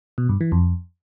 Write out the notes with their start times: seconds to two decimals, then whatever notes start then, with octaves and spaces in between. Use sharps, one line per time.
0.18 B2
0.29 G2
0.41 E3
0.52 F2